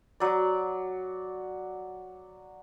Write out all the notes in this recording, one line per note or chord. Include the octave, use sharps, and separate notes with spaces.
F#3 D5